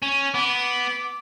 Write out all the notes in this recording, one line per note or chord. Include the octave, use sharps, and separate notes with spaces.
C#4
B3 D6